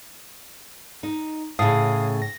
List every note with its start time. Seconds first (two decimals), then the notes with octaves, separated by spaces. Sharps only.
1.03 D#4
1.59 A2 C#3 F5 D#6 C7
2.22 A#6